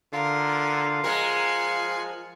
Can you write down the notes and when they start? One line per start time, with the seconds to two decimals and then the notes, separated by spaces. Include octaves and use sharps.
0.13 D3 F4 A#4 F5
1.04 F3 G#3 A#4 F#5 G#5